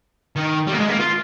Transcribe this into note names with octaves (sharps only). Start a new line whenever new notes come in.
D#3
G3
A#3
G#3
A#3
F4